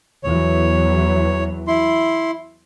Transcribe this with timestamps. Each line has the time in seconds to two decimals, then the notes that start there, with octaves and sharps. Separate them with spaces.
0.24 E2 E3 F#3 C#5
1.67 E4 C6